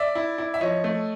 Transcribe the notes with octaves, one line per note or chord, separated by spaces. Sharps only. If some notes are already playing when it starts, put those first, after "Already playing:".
Already playing: D5 E5
E4
E4
E5
F3 C#5 D#5
A3